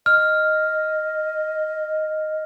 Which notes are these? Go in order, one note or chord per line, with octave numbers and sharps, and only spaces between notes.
D#5 F6